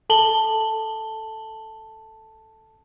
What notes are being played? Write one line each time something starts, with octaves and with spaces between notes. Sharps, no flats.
A4 A5 F#7 G7